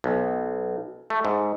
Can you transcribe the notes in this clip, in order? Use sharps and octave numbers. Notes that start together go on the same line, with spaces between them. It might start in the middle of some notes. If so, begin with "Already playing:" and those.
B1
A3
G#2